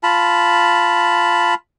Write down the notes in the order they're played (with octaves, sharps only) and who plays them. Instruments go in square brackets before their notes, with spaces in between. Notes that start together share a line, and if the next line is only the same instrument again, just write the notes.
[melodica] F4 A5 B5